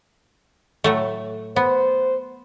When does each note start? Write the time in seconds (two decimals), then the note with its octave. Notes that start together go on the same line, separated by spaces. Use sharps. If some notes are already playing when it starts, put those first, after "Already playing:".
0.84 A2 F#3 A3
1.56 B3 C5